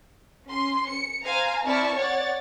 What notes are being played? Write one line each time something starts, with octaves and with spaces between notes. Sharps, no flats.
C#4 C6
C#7
C5 F5 G#5 A#5
C4 E4 D5 A5 C#6 F6
C#5 D5 F#5 A6